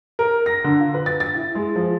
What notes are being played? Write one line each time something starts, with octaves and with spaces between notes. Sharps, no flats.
A#4
A#6
D3
F4
B4
A6
A6
E4
G#3
F3